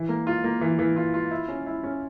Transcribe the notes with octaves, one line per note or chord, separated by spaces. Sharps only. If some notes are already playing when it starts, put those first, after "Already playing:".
Already playing: E3
A#3
F4
A#3
E3
E3
F4
F4
E4
C#4
E4
C#4